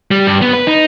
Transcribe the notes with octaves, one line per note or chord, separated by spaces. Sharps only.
G3
G2
B3
B4
D#4